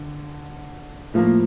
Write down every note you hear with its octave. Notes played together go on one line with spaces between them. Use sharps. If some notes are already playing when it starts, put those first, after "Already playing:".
Already playing: D3
A2 F3 A#3